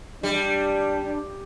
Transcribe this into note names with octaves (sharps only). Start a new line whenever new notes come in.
G3 D4